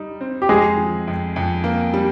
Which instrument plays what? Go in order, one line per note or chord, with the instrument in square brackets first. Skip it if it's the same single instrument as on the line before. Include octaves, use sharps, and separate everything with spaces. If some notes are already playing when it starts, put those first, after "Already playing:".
Already playing: [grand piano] G3 D#4
C4
[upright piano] G4
[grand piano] F2 [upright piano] G#3 G#4
[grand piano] F3
F2
F2
A#3
G3